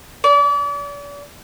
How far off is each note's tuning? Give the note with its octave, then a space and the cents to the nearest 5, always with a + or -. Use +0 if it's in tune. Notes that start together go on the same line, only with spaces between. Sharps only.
D5 -40